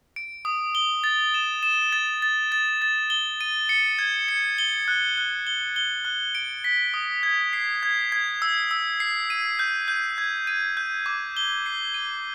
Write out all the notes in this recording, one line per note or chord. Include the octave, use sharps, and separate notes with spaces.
D7
D#6
G7
A6
E7
E7
A6
A6
A6
A6
G7
D#7
C#7
G#6
C#7
G7
F#6
F#6
G7
G7
F#6
D7
B6
D#6
G#6
C7
G#6
G#6
E6
E6
C7
D#7
G6
G6
G#6
D#7
G6
D6
G7
C7
D#7